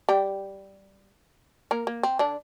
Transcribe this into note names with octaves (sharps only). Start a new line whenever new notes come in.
G3 G4
A#3 A#4
A#3
C4
D3 D4